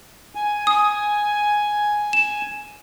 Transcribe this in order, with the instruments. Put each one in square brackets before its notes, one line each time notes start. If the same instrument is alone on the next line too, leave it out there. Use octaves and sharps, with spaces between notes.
[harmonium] G#5
[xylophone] D#6
E7